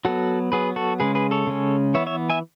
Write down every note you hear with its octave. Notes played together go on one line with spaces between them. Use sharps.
F#3 B3 F#4 A4
F#3 B3 G#4 B4
F#4 A4
C#3 G#3 C#4 G#4 B4
G#4 B4
A4 C#5
C#3 G#3 C#4
E3 B3 C#5 E5
C#5 E5
E5 G#5